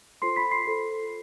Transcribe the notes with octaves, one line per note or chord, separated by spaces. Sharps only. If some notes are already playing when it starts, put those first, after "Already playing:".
F4 A4 C5 C6 C7
B5 B6
C6 C7
F4 A4 C5